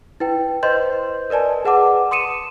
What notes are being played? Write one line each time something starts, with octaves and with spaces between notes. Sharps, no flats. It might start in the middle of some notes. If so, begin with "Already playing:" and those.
E4 B4 G5
B4 C5 D#5 C6 G6
A#4 B4 D5 G#5 A5
G#4 B4 F#5 A5 D6
C6 D#6 C#7 D#7 E7